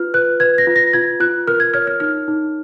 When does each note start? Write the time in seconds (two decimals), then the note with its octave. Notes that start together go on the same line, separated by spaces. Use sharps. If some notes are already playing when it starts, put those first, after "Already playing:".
Already playing: F4 B4 F6
0.14 B4 F#6
0.40 B4 G#6
0.58 A#6
0.67 F4
0.76 A#6
0.93 F4 G#6
1.20 F4 F#6
1.47 A#4 F6
1.60 G#6
1.74 C#5 F6
1.87 F6
2.00 D#4 F6
2.28 D#4